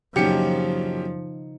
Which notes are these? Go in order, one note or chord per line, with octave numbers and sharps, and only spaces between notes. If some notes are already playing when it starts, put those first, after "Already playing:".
A#1 F#2 C#3 F3 D#4 G4 C#7